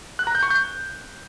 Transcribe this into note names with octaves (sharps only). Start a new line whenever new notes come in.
F#6
A#5
G6
C#6
G6